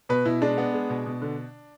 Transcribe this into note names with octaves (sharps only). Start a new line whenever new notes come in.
B2 B4
B2 E4
G#3 D4
B3
G#3
B2
B2
D3